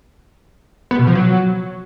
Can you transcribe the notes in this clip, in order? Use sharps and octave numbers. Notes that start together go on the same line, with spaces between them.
B3
B2
F3
F#3